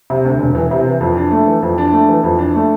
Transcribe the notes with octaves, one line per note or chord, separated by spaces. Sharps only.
C3
D2
E1
E3
C3
E3
F2
D4
A3
E3
F2
D4
A3
E3
F2
D4
A3